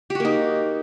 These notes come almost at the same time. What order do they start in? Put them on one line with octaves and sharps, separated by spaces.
G4 F#4 A#3 D#4